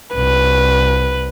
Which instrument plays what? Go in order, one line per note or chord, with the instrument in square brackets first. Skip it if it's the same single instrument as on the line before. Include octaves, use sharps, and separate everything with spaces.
[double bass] C2 [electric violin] B4